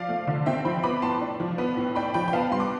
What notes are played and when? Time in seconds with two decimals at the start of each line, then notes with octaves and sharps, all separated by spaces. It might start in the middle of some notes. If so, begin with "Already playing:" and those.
Already playing: F3 D5 F5
0.09 A3
0.27 D3
0.46 C4 E5 G5
0.65 F3 G5 B5
0.83 B3 B5 D6
1.02 A2 A5 C6
1.21 D4
1.40 F3
1.58 B3
1.77 A2
1.95 D4 G5 B5
2.14 F3 G5 B5
2.28 G5
2.33 B3 F5 A5
2.52 G2 C6
2.60 D6